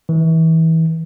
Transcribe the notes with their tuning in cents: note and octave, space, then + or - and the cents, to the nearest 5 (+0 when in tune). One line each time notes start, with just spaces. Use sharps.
E3 -30